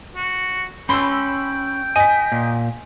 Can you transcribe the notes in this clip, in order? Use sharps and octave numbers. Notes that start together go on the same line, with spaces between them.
F#4
C#4 G5 B5 C6 E6
D#5 G#5 B6
A#2